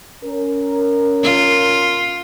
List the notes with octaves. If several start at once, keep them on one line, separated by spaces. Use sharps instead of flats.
C#4 A#4
F4